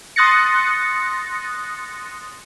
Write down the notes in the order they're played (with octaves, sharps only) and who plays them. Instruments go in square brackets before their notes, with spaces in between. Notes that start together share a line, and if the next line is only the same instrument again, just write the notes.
[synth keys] C6 D#6 F#6 A6 A#6 C#7